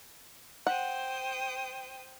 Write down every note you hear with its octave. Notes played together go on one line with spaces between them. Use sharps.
C5 F#5 G5 D#6